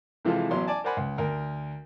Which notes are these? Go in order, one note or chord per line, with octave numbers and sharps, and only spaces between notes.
C3 E3 F3 G#3 F4 A4
A1 F#3 B3 C6
D5 G#5 A5
A#4 C5 D5 F#5 G#5 B5
C#2
D2 A#4